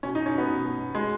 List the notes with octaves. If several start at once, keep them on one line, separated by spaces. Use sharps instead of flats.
B2 C#4
D#4
B2
C#4
B2 B3
B2
B2
B2
B2 G#3